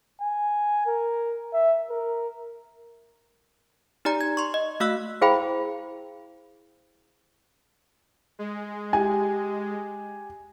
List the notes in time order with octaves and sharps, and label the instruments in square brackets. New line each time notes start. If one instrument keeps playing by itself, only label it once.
[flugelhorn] G#5
A#4
E5
A#4
[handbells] D#4 G4 D5 A#5
G#6
C6 C#6
D#5
A3 F#4 F5 E6 F#6
[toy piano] E4 G#4 C5 F5 G5 B5
[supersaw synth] G#3
[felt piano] G4 G#5